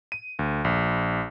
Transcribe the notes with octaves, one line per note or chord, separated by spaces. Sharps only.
D#7
D2
A#1